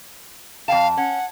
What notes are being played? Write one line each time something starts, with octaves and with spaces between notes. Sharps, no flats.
F2 F5 G5 A5
C#4 F#5